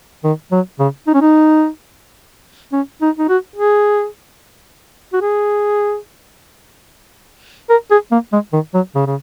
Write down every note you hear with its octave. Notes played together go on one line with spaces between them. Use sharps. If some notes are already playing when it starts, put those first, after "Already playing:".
D#3
F#3
C#3
D#4
C#4
D#4
C#4
D#4
D#4
F#4
G#4
F#4
G#4
A#4
G#4
A#3
G#3
D#3
F#3
C#3
C#3